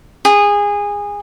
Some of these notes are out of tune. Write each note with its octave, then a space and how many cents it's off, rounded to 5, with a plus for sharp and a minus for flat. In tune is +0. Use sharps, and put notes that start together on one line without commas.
G#4 -20